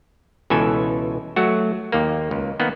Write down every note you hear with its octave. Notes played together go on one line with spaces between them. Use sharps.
C#2 B2 E3 A4 G#5
F#3 A3 F#4
D#2 A#3
C#2
D#3 A#3 B3